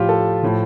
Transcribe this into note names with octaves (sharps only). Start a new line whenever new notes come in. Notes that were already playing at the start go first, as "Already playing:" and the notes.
Already playing: A2 F3 F4 G4
A4
A2 F3